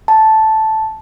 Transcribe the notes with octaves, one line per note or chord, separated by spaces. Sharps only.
A5